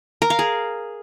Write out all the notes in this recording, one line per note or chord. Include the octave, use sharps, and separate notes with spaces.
A#4
F5
G#4